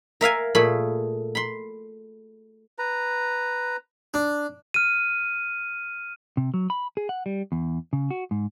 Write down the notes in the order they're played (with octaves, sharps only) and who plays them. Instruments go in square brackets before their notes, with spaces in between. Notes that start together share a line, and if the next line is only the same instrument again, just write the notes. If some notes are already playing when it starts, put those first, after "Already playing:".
[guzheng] A#4 E5 F5 G#5
A#2 A3 G#4 B5
B5 C6
[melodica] B4 A#5
[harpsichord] D4
[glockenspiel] F6 D#7
[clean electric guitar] C3
F#3
B5
G#4
F#5
G3
E2
C#3
F#4
G#2